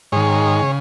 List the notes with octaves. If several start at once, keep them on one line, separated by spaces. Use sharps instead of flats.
G#2 D#3 G#4 C#5
C#3